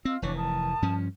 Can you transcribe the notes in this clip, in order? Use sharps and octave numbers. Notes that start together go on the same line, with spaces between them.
C4 F4 D#5 E6
F1 E3 D4 C#5 C#6
A#4 A5 D#6
G2 F3 C#4